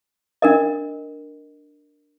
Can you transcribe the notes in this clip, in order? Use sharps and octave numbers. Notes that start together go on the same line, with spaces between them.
D4 A#4 D#5